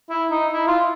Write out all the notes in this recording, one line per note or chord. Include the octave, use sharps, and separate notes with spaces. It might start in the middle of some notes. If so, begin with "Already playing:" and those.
E4
D#4
E4
F4